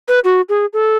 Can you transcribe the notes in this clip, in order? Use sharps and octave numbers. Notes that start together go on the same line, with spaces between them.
B4
F#4
G#4
A4